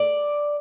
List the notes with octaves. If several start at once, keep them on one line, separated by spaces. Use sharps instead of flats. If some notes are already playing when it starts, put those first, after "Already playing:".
Already playing: D5